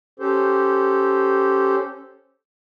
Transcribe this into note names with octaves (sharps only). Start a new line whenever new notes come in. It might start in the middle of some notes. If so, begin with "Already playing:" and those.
C#4 G4 A4 C5